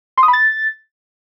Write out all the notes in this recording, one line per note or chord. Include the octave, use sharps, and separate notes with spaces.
C6
D#6
B5
A6